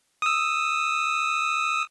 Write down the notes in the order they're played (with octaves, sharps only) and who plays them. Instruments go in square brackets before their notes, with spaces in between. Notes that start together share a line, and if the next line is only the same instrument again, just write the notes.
[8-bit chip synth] D#6 E6